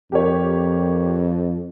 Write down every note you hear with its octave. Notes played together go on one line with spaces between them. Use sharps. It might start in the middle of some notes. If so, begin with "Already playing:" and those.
F2 G4 A#4 C#5